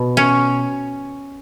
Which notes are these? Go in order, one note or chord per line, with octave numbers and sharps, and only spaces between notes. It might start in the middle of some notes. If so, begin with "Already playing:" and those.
Already playing: B2
C#4